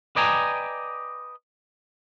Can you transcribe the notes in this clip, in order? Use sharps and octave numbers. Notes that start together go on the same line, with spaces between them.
B4 D5 D#5 G5 G#5 A#5